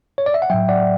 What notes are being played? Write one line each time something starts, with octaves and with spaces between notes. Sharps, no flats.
C#5
D5
E5
F#5
A2 F#3 E5 G5
D5 F#5